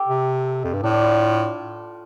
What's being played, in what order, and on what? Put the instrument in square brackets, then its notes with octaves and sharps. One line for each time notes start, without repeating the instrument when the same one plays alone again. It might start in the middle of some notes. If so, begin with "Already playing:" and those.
Already playing: [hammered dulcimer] G4 A4
[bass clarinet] C3
F2
G2
[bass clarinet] A2 [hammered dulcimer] D4
[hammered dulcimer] F4